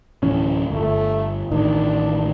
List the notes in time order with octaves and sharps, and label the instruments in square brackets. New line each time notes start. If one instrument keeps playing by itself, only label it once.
[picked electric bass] D1 E3 C#4
[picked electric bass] G1 [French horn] A3
[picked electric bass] A1 D#3 [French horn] D4